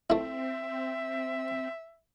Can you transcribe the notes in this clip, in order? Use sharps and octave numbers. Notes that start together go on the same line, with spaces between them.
A3 C4 E4 E5